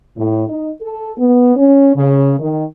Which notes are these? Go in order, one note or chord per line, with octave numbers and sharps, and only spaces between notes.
A2
D#4
A4
B3
C#4
C#3
D#3